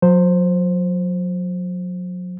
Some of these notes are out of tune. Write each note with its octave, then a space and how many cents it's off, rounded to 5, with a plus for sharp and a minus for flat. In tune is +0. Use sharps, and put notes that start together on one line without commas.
F#3 -35 C5 +0